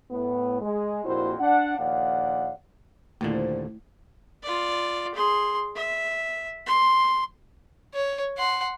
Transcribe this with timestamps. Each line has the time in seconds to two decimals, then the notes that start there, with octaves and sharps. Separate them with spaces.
0.11 A2 B3
0.61 G#3
1.04 A#1 F2 A#2 E4 F#4 C5
1.40 D4 F#5
1.78 A#1 D#2 D5 F5 F#5
3.21 D#2 A#2 D3 F3 A3 C4 E4
4.43 F4 D5
5.14 G#4 C6
5.75 E5
6.66 C6
7.94 C#5
8.38 F#5 C6